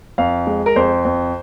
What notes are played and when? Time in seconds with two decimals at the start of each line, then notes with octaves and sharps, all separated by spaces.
0.18 F2 F5
0.47 G#3
0.66 A#4
0.76 F2 C5
1.05 F2